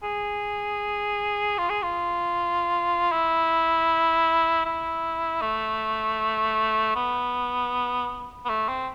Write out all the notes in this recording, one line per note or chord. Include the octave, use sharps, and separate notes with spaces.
G#4
F4
G#4
F4
E4
E4
A3
B3
B3
A3
C4